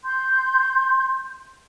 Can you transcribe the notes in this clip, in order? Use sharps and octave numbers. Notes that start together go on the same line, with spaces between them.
C6 G6